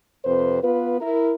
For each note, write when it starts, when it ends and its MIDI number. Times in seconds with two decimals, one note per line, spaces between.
0.25 0.60 41
0.25 0.60 48
0.25 0.60 71
0.25 0.60 72
0.63 1.00 59
0.63 1.00 65
0.63 1.00 71
1.00 1.32 64
1.00 1.32 70